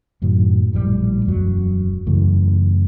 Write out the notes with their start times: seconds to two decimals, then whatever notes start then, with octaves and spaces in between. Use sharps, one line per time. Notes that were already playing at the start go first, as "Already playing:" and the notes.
0.22 F#2 A2 D#3 F#3
0.73 A#1 A2 C#3 G3
1.26 E1 F#2 F#3
2.07 F#2 C#3 E3 A3